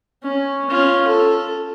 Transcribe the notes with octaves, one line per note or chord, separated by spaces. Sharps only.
C#4
C#4 F4
A4